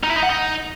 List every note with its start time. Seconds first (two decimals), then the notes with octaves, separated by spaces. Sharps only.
0.04 D#4
0.10 E4
0.16 D#4
0.23 F#5
0.29 D#4